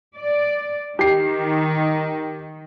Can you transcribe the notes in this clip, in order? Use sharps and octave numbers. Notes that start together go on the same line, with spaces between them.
D5
D#3 G4 C7